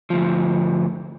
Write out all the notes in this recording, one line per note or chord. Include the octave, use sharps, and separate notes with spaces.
D2 F3